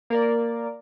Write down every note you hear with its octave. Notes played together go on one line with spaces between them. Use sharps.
A#3 A#4 D5